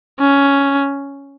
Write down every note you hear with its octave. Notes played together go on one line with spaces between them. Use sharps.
C#4